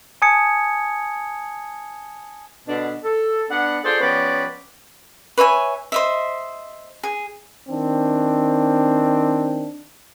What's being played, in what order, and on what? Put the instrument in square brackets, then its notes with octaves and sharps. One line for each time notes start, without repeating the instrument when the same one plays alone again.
[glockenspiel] G#5 A5 D#6 G#6 C#7
[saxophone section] B2 D3 D4
A4
B3 D4 F#5
F4 G#4 A4 C5 D5
F3 B3 C#4 G4 B4 D5
[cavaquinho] B4 C#5 E5 G#5
C5 D#5 E5
G#4
[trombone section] D#3 C4 D4